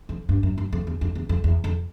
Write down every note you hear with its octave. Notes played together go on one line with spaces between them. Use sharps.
F2
G2
F#2
F#2
F2
E2
F2
E2
F2
E2
F2